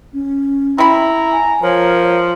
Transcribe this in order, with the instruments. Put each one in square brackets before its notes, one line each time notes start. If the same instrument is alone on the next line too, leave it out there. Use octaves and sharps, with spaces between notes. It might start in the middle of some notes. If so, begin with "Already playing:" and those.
[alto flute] C#4
[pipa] C3 B5 [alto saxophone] E4 [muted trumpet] A#5
[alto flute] G#5
[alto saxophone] F3 [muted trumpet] A#4 [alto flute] C#5